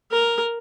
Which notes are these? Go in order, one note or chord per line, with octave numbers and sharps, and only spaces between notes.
A#4